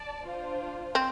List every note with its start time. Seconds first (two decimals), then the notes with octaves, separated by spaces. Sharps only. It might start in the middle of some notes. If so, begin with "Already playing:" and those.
Already playing: D5 A5
0.26 D4 F4 C5
0.95 C4